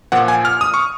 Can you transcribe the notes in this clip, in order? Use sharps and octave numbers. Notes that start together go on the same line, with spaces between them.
A#2 F3 F#5
G#5
F6
D#6
C#6